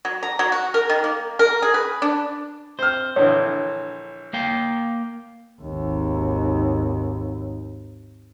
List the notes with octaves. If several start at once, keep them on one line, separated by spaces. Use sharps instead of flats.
F#3
A#5
F#3
F#4
A#4
D#3
A#3
A#4
G#4
B4
D4
C4 C5 F6
A#1 D3 E3 C#5
A#3 F5 G5
G#1 D#2